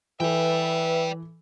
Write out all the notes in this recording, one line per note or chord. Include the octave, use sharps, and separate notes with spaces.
E3 A4 B4 D5 E5 G5